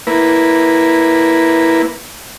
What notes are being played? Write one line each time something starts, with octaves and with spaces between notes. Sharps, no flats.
A#3 E4 B4